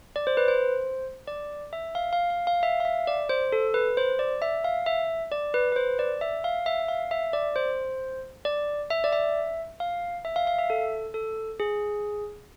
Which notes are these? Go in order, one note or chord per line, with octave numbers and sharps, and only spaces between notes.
D5
C5
B4
C5
D5
E5
F5
F5
F5
F5
E5
F5
E5
D5
C5
A4
B4
C5
D5
E5
F5
E5
D5
B4
B4
C5
D5
E5
F5
E5
F5
E5
D5
C5
D5
E5
D5
E5
F5
E5
F5
F5
E5
A4
A4
G#4